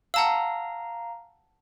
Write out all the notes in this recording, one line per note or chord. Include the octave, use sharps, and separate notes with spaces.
F5 F#5 A5 A#5 E6